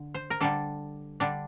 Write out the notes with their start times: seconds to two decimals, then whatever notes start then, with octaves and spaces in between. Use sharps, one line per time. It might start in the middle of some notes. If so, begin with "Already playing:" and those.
Already playing: D3
0.14 C5
0.30 A#4
0.40 D3 G3 D4 A4
1.20 D3 G3 D4